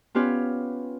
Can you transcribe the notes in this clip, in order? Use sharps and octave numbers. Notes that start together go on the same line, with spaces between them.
B3 C#4 F4 G4 B4 C#5